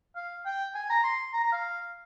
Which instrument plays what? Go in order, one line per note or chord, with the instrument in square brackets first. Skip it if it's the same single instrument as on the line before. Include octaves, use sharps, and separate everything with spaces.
[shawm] F5
G5
G#5
A#5
C6
A#5
A#5
F5